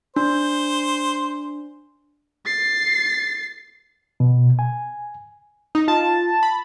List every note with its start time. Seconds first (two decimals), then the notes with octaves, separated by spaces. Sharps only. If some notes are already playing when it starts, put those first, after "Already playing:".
0.16 D4 C5
2.46 A6 C7
4.20 B2
4.59 G#5
5.75 D#4
5.88 F4 A5
6.43 B5